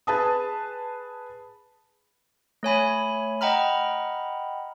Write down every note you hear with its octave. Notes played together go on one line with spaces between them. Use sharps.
G#4 B4 A5 D#6
A3 C#5 G#5 B5
D#5 F#5 G5 A#5 B5 F6